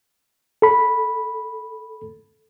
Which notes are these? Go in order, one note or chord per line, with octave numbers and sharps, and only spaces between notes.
A4 B5